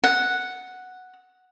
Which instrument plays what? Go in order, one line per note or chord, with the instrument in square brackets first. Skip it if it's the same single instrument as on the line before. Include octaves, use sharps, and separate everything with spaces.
[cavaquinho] F#5